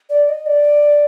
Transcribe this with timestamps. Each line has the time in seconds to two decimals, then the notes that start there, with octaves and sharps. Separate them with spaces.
0.10 D5
0.29 D#5
0.46 D5